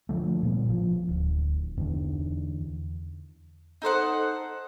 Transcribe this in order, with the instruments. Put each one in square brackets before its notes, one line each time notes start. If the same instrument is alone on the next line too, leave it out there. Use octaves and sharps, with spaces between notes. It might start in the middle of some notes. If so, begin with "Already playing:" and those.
[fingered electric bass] D3 F3 A3
A#2 G3 B3
A1 F3
D1
E2 D3 E3
[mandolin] D#4 A4 C5 F#5